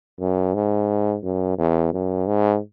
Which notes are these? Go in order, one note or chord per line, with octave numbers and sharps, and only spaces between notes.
F#2
G#2
F#2
E2
F#2
G#2